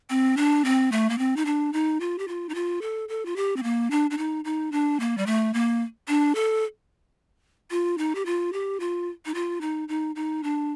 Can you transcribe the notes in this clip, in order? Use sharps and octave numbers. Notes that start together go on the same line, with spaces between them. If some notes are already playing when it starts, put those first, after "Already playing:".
C4
D4
C4
A3
A#3
C4
D#4
D4
D#4
F4
G4
F4
D#4
F4
A4
A4
F4
G4
C4
A#3
D4
D4
D#4
D#4
D4
A#3
G3
A3
A#3
D4
A4
F4
D#4
G4
F4
G4
F4
D#4
F4
D#4
D#4
D#4
D4